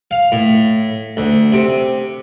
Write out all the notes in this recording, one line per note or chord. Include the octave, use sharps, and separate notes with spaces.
F5
A2
D2
C3